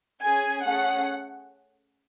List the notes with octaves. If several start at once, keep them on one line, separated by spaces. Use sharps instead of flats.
C#4 G#4 G#5
A3 C#4 G#4 F#5